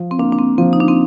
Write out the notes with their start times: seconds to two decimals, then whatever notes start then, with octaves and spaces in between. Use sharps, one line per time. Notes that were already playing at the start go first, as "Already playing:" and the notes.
Already playing: F3
0.11 C4
0.19 A#3 D4
0.32 D4
0.38 C4
0.58 F3 C4
0.73 D#4
0.80 D4
0.88 C4